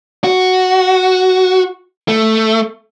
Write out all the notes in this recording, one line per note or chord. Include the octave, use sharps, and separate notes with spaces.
F#4
A3